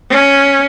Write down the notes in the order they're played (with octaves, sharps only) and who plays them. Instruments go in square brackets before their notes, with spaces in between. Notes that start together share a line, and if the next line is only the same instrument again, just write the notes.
[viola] C#4